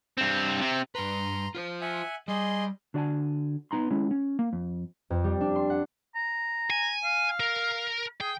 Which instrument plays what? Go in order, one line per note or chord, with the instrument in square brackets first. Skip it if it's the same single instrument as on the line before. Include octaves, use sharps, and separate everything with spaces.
[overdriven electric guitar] G2 C4
C3 C4
[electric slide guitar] G2 B4 [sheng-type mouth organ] A#5 C6
[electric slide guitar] F4 B4 C5
[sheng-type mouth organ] E5 F#5 G#5
[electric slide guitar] G3 [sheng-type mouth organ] G#4 D#5 C6
[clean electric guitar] D3 F#4 D5 F#5 G#5 A5
B3 D#4 A#5 C6
G#3 C#4 E4
C#4
A#3
F2
[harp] F2
G3
D4
C6
F#5
[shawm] A#5
[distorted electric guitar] G#5
[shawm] F5
[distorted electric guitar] A#4
[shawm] G#4 [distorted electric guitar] G5